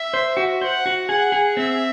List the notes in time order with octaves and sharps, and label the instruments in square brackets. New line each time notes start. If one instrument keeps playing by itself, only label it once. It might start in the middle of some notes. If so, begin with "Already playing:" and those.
Already playing: [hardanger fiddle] E5
[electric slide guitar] C5
F#4
[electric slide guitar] C5 [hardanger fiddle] F#5
[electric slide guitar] F#4
[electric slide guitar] G#4 [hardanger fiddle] F#5
[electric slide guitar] G#4
[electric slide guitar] C4 [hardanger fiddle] E5